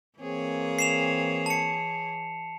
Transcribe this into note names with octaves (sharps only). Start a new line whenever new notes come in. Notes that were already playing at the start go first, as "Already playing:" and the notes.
E3 A#3 C4 G#4 C#5
C7 E7 F7
A5 C#7